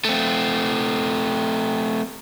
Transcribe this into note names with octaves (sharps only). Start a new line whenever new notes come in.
A3 C4